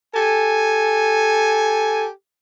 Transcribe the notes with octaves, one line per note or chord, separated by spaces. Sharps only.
G4 A4 G#5